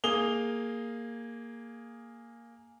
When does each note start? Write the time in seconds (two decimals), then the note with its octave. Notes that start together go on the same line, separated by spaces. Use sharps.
0.04 A#3 G#4 D#6 F7 G7